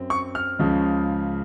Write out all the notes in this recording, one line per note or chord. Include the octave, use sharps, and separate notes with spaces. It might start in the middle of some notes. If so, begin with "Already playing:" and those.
Already playing: F#2 C4
C#6
F6
C#2 C#3 F3